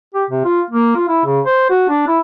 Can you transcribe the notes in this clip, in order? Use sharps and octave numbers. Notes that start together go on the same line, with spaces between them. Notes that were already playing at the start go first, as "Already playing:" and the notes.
G4
C3
F4
A#3
F4
E4
C#3
C5
F#4
D4
E4